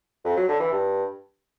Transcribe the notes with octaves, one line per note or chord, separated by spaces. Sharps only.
F2
F#3
D3
E3
G2